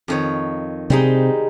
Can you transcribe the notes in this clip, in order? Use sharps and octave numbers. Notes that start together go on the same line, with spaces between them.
F2 D#3 C#5
C3 G3 G#3 C4 D#4